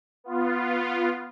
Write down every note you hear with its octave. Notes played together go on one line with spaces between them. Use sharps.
B3 F4